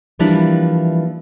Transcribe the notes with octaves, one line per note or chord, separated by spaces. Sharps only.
E3 F3 G3 A#3 D4 E4